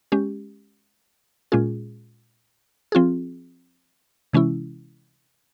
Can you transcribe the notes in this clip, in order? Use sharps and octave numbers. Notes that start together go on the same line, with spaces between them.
G#3 C#4 G4
A#2 G#3 C#4 F4 G#4
F3 C4 F4 G#4
C3 E3 G#3 C#4 E4